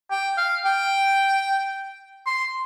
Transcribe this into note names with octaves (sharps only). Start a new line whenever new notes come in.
G5
F5
G5
C6